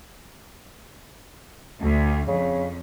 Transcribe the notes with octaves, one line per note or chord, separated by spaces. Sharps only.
D2
F2 C#3